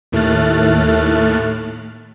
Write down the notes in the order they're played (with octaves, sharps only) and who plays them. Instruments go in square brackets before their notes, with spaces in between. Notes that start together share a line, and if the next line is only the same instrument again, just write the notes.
[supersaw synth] D#2 A2 A3 F6 F#6 A6